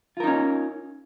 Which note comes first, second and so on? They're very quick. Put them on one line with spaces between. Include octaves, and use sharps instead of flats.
F4 A#4 D#4 C#4